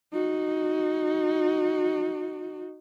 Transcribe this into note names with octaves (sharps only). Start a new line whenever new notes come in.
D#4 F#4